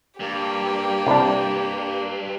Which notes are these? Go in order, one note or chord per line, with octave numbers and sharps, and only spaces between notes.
G2 A#3 G4
C2 D4